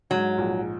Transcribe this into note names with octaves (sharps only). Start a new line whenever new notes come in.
G#2 F#3
A#1